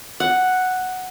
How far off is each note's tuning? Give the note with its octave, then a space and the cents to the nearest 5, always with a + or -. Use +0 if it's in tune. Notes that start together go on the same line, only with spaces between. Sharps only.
F#5 +0